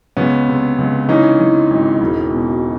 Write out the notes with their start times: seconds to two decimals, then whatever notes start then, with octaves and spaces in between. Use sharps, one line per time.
0.17 C#2 B3 C#4
0.48 C3
0.78 C#2
1.09 E3 C#4 D#4
1.40 E3
1.70 G#1
2.00 E1
2.31 B2